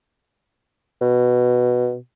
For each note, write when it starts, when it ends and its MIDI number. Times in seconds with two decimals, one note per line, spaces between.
1.01 1.96 47